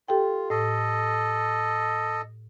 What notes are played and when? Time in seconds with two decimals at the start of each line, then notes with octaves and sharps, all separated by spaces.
0.08 F4 G4 A4 G5
0.50 A2 A4 D#5